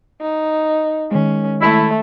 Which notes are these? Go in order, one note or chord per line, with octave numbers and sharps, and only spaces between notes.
D#4
D#3 G#3 C#4
A3 E4